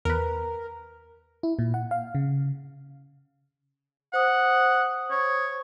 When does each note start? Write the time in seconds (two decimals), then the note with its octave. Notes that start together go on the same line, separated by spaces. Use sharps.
0.05 E2 A#4 B4
1.43 E4
1.59 A#2
1.74 F#5
1.91 F5
2.15 C#3
4.14 C5 F#5 D#6
5.11 C#5